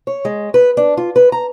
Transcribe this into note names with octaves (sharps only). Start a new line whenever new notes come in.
C#5
G#3
B4
D4
F4
B4
A#5